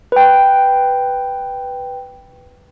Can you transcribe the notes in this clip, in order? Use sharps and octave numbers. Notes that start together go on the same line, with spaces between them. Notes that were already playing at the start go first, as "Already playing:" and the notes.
B4 G5